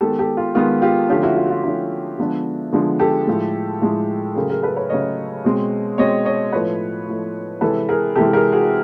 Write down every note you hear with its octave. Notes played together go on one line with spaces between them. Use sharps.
D#3 G#3 B3 G4 A4
G4 A4
F4
D#3 G#3 B3 F4
F4 G4
D3 F3 A3 C#4 F4 G4
E4 F#4
F4
F#4
F4
D3 F3 A3 C#4 E4 F#4
D3 F3 G#3 B3 D4
D3 F3 G#3 B3 D4
G4 A4
A2 F3 G#3
A2 F3 G#3
C#3 F#3 A3 G#4 A#4
G#4 A#4
A4 B4
B4 C#5
C#3 F#3 A3 C#5 D#5
B2 G#3 C4
B2 G#3 C4 C#5 D#5
C#5 D#5
A2 F3 A3 B4 C#5
A2 F3 A3
C3 E3 G#3 A4 B4
G#4 A#4
C3 E3 G#3 G4 A4
G#4 A#4
F#4 G#4